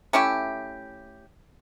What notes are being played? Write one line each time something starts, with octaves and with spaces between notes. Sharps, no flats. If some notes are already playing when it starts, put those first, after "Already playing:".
A3 C#4 E4 G4